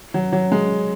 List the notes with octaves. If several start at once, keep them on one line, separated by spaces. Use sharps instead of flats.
F#3
F#3
G#3